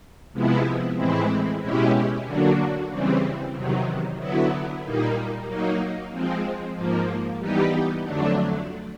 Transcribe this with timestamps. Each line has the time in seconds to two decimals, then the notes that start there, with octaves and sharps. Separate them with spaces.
0.33 C3 F3 G#3 B3 E4
0.97 A2 E3 G#3 C4 E4
1.61 B2 G#3 C#4 E4 G4
2.26 D3 F#3 A#3 D4 F#4
2.90 C#3 E3 G3 C4
3.54 E2 C3 D#3 F#3
4.18 D3 F#3 B3 E4
4.83 A#2 G3 A#3 D#4
5.46 F#3 A#3 D#4
6.11 F3 G#3 C4
6.75 G#2 F3 A#3
7.39 E3 G3 B3 D#4 G4
8.04 F2 D3 F#3 A3 D4